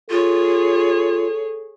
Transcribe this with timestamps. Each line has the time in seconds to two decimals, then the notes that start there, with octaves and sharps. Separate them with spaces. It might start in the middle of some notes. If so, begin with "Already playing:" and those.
0.10 F4 G#4 A4 C#5